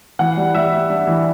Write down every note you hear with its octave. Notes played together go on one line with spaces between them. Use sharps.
E3 F#5
G3
G3 E5
G3
D4
E3